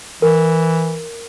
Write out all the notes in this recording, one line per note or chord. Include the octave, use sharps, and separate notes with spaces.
E3 A#4